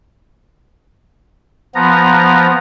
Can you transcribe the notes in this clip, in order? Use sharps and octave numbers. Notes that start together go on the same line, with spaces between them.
F3 B3 A#5